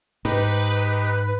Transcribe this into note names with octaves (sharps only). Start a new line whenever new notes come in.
G#2 D#4 G4 B4